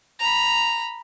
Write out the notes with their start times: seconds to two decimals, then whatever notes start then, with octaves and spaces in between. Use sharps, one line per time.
0.19 A#5 B5